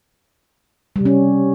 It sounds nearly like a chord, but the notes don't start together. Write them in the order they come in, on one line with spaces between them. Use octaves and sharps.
G3 C3 C#4